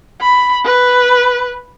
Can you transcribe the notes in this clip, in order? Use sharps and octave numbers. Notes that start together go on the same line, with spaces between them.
B5
B4